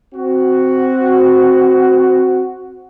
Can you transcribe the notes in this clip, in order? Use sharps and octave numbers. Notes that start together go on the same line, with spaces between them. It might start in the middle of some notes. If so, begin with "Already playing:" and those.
C4 F#4